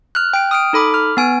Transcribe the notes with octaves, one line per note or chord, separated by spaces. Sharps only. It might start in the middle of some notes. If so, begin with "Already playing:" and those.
F6 F#6
G5 D7
D#6 F6 D7
D#4 A4 B5 D6
F6
B3 G#5 D7